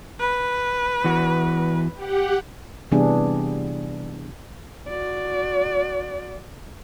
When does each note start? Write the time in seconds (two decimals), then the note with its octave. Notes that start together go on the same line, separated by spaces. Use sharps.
0.19 B4
1.04 E2 E3 F#4
1.94 G4 F#5
2.92 C3 E3 G3 B3 D4 G#4
4.89 F#4 D5